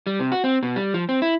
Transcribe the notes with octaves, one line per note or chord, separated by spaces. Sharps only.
G3
C3
F#4
C4
B2
G3
F3
C4
E4